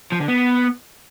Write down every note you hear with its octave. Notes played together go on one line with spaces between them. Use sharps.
F3
D3
B3